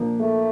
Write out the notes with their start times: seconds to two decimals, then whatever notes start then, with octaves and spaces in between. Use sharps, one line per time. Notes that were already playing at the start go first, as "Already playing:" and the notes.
Already playing: A#2 F3 A#3 D4
0.20 A3